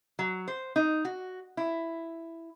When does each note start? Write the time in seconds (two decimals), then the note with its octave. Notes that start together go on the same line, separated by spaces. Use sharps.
0.19 F#3
0.48 C5
0.76 D#4
1.05 F#4
1.57 E4